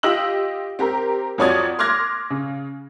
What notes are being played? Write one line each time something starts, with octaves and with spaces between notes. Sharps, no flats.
F4 G4 D#5 E6 F#7
C4 G4 A#4
F2 F#3 C#5 D5 D#6 G#6
C6 D6 F6 F#6 G#6 A#6
C#3